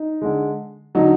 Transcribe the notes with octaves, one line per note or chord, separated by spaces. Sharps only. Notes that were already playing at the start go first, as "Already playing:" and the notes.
Already playing: D#4
D3 G#3
D3 F#3 D#4